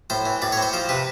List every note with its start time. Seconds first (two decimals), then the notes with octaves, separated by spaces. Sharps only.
0.10 A2 C5
0.26 E3
0.42 A2 D5
0.52 C#5
0.57 C4
0.62 C5
0.73 F3 C5
0.89 C3 B4